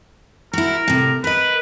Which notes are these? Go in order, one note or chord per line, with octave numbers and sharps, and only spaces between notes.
E4 F#4 A#4
A2 C3
A#4 B4 D#5